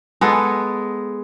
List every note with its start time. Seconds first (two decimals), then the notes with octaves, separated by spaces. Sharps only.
0.21 G#3 B3 A4